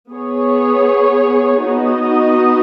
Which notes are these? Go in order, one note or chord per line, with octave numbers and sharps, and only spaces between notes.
B3 G#4 C#5
B3 D#4 F#4 D#5